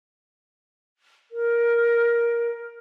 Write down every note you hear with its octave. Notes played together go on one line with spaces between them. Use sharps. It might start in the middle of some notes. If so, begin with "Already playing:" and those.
A#4